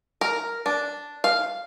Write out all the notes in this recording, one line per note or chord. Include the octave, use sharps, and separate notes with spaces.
A#4
D4
F5